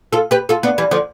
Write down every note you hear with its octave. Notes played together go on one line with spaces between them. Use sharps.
F4 A4
G4 B4
F4 A4
B3 D4
E3 G3
D3 F3